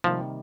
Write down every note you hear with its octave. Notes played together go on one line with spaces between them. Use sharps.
C3 D#3 F3 G3 A#3